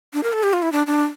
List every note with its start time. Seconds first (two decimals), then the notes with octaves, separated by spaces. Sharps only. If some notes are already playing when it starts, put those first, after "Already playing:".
0.14 D4
0.23 A#4
0.33 A4
0.43 G4
0.53 F4
0.62 E4
0.72 D4
0.87 D4